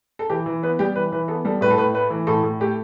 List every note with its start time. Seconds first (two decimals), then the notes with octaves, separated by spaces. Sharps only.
0.19 A4
0.30 E3 G4
0.46 E3
0.63 B3 B4
0.79 G3 G4
0.96 E3 B4
1.12 E3 B4
1.28 B3 A4
1.45 G3 A4
1.61 A2 B4
1.70 A4
1.78 A2 B4
1.94 A3 B4
2.10 E3
2.27 A2 A4
2.43 A2
2.60 A3 G4